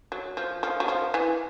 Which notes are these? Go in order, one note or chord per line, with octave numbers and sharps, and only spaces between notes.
F#3
F3
F3
F#3
F3
E3